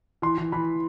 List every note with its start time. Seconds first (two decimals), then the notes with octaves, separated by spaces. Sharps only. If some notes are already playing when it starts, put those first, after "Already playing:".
0.22 E3 C6
0.38 E3
0.52 E3 B5